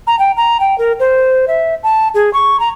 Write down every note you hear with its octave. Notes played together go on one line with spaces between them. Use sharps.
A#5
G5
A#5
G5
A#4
C5
E5
A5
G#4
C#6
A#5